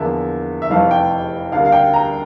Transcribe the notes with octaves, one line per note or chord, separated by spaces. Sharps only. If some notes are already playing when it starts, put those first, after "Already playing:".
Already playing: E2 D3 F3 A#3 E5
E5
F1 F2 E3 A3 F5
G5
D2 D3 G3 A#3 F5
F5
G5
A#5